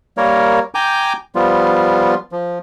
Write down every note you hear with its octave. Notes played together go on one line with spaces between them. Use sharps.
G3 A#3 A#4 C#5
G5 G#5 A#5 D6 G6
F3 G3 B3 F4
F3